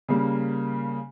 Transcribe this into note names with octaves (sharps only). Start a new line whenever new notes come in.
C#3 G3 A#3